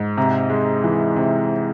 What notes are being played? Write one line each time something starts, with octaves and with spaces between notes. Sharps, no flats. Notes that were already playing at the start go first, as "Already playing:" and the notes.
Already playing: G#2
C3 A#5
G#3
E3
C3